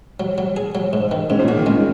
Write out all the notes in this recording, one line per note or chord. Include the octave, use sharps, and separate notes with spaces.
F#3
F#3
G#4
F#3
G#2
D#3
G#2 C#4
A#2
C#3 F#4
D#3
C#3 G#3